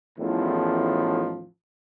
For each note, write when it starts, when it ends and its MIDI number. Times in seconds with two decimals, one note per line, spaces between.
0.19 1.46 33
0.19 1.46 40
0.19 1.46 45
0.19 1.46 51
0.19 1.46 53